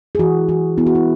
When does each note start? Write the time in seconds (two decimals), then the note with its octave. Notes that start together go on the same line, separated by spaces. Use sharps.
0.15 G#4
0.19 E3 F#4
0.49 E3 F#4
0.78 B3 E4
0.87 F#4
0.95 E4